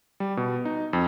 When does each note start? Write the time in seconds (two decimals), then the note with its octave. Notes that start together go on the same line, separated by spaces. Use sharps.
0.20 G3
0.37 B2
0.65 D#4
0.93 F2